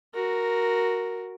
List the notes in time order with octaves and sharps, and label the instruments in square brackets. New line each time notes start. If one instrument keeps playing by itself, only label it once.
[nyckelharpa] F#4 A#4